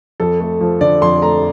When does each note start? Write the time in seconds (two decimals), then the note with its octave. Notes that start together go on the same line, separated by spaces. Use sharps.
0.20 F2 A4
0.40 A3
0.61 F3
0.81 D3 D5
1.01 F2 C6
1.22 A3 A#5